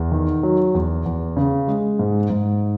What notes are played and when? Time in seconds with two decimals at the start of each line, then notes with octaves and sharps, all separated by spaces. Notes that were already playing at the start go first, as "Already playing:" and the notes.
Already playing: E2
0.12 D#3
0.43 F#3
0.75 E2
1.06 E2
1.37 C#3
1.68 G#3
1.99 G#2
2.30 G#2